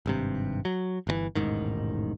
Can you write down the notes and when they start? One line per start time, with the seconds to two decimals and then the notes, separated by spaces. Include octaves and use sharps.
0.06 G#1 G2 C3
0.65 F#3
1.07 G1 A#2 E3
1.35 E1 A1 G#2 D#3